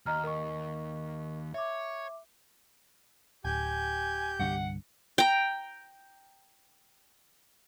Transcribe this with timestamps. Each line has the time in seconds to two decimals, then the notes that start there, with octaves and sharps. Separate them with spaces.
0.06 D#2 D#5 A#5 F6
0.24 A#4 D#5 C#6
1.54 C#5 E5 D6
3.45 D1 G4 G#5 G6
4.39 C2 G2 D3 F#5
5.18 G5 A#5